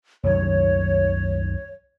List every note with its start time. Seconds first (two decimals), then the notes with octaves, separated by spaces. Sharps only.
0.24 C2 F#2 D#3 C#5